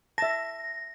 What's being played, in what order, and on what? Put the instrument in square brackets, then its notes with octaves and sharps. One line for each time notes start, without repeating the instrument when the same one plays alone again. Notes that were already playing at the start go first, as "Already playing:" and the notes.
[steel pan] E5 A5 [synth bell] A#6